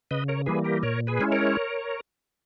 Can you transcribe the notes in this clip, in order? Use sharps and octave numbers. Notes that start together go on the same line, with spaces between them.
C#3 B4 D#5
A#4 C#5
E3 G3 A#3 G#4 B4
G4 A#4
A#2 A#4 C#5
G#4 B4
G#3 C#4 E4
A#4 C#5